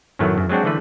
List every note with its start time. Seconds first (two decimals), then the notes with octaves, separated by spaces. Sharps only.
0.19 F#2 A2 D#3 F#3 A3 B3
0.38 F#2
0.49 F#3 G#3 C4 D4 F#4
0.65 D3 E3 G3 A3 B4